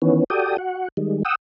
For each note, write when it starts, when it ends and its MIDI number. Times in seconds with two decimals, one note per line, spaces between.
0.02 0.24 51
0.02 0.24 52
0.02 0.24 59
0.02 0.24 61
0.30 0.57 66
0.30 0.57 67
0.30 0.57 69
0.30 0.57 74
0.30 0.57 79
0.30 0.57 87
0.58 0.88 66
0.58 0.88 78
0.97 1.23 51
0.97 1.23 55
0.97 1.23 56
1.25 1.35 78
1.25 1.35 79
1.25 1.35 87
1.25 1.35 88